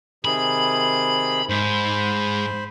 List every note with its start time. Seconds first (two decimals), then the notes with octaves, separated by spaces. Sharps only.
0.25 C3 D#3 G#4 B5
1.50 G#2 C5 B5